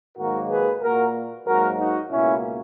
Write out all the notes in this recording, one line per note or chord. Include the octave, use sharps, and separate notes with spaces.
G#2 D#3 F#3 A#3 F#4 A#4
G#4 B4
A#2 A#3 F#4 A#4
G#2 F#3 A#3 F#4 A#4
D#4 F#4
C#2 B2 A#3 C#4 E4